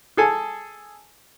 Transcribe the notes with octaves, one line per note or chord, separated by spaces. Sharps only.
G#4 A4 G#5